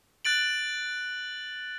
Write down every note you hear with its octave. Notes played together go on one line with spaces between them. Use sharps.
F#6 A6 D7 F#7